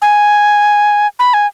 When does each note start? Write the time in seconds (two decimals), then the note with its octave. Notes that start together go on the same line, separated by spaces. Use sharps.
0.02 G#5
1.19 B5
1.34 G#5